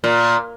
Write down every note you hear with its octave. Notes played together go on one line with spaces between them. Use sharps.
A#2